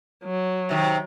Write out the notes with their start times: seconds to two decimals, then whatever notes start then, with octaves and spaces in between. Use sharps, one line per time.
0.24 F#3
0.69 C3 D#3